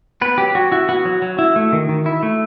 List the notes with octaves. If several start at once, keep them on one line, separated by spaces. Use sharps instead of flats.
B3 B4
F#3 G4
F#3 F#4
E4 F#4
B3 F#4
F#3
F#3
E4
A3
D#3
D#3
E4
A3